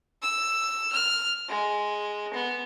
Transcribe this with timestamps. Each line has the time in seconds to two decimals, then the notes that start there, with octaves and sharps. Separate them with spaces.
0.22 E6
0.92 F6
1.48 G#3
2.33 B3